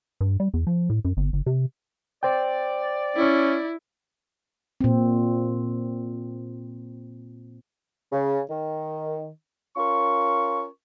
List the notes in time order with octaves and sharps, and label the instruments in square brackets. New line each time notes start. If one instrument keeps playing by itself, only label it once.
[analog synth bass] G2
G3
E2
F3
A2
F#2
G1
G1
C3
[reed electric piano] C5 G5 [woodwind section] D5
[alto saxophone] C#4 [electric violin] E4
[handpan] A#2 C4
[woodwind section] C#3
D#3
C#4 F4 A#4 C#6